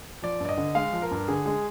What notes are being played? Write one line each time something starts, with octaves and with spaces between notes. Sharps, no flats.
F3 D5
G2 D5
D#5
D3
G#3 F5
F3
A#4
G2
D3 G#4
G#3 G#4